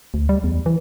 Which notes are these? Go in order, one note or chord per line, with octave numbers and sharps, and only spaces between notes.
D2
G3
E2
E3